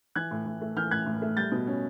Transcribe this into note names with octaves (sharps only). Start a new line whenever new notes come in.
E3 F#6 G#6
A2
A2
A3
E3 F6 G6
A2 F#6 G#6
A2
A3
G3 G6 A6
B2
C#4